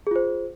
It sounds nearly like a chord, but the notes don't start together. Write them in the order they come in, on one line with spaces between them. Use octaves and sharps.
G#4 F4 C5